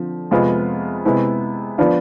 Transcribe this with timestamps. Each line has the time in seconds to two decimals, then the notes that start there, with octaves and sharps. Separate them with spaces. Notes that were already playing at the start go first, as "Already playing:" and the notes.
Already playing: D3 F3 C4
0.31 F2 C3 G#3 B3 F4
1.05 C3 G#3 B3 E4
1.78 F3 B3 D4 F4